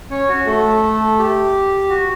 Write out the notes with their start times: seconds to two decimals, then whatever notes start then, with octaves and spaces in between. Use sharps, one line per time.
0.10 C#4 C#5
0.29 F#4
0.46 A3 A4
1.19 G4
1.89 F#4